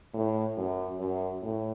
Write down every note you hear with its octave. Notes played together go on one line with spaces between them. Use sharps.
A2
F#2
F#2
A2